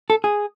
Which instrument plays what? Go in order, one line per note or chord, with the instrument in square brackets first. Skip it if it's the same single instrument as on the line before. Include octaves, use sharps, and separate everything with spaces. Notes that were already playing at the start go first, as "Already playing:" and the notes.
[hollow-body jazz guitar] A4
G#4